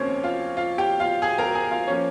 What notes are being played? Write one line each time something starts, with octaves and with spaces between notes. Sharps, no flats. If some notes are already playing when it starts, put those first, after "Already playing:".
Already playing: F1 D#2 C#3 A#3 C4 C#4 C5 C#5
F4 F5
F4 F5
G4 G5
F4 F5
G#4 G#5
A#4 A#5
G#4 G#5
F4 F5
F3 A#3 C#4 C#5